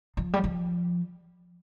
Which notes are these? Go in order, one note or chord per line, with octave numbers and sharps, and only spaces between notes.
F3
G3
F3